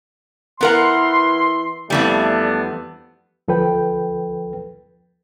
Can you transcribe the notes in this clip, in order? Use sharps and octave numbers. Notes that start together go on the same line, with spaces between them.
E3 B3 A#4 F#5 C6
F2 E3 G3 A3 B3 D4
D2 F3 A4 B4 G5